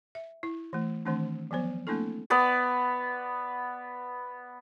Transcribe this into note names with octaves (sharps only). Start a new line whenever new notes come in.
E5
E4
E3 A3
D#3 E3 A3 C4 D4
F3 F#3 B3 C5
A3 A#3 C4 D4 E4 A4
B3 B4 D5